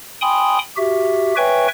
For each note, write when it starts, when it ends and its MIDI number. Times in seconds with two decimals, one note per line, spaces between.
0.21 0.59 79
0.21 0.59 80
0.21 0.59 83
0.21 0.59 84
0.21 0.59 87
0.77 1.34 66
0.77 1.34 67
0.77 1.34 76
1.37 1.68 71
1.37 1.68 73
1.37 1.68 76
1.37 1.68 79
1.37 1.68 80
1.37 1.68 85